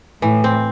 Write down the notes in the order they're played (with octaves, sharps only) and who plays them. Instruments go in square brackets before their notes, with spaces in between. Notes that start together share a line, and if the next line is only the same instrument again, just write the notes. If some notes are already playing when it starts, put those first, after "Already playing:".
[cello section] A2 [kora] E3
[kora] C4